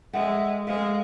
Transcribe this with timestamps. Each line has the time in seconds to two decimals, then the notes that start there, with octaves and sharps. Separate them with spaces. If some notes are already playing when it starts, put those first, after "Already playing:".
0.13 G#3 A4 E5 F#5 G5
0.67 G#3 A4 C5 E5 F5